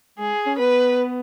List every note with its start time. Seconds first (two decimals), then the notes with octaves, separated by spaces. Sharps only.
0.19 G#3 G#4
0.46 C#4
0.59 B3 B4